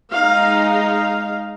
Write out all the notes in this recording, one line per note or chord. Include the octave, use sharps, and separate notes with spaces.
G#3 D#4 F5
F5